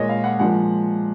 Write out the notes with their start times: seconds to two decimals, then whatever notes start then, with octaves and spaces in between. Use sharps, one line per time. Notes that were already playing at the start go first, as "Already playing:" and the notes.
Already playing: A#2 G#3 C#5 D#5
0.09 F5
0.24 F#5
0.39 A#2 F3 G#3 F#5